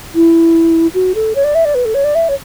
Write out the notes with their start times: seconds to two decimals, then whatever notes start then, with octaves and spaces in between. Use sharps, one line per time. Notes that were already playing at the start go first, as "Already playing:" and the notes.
0.15 E4
0.94 F#4
1.15 A4
1.35 C#5
1.44 D5
1.55 E5
1.65 D5
1.75 B4
1.85 A4
1.94 C#5
2.04 D5
2.15 E5
2.29 C#5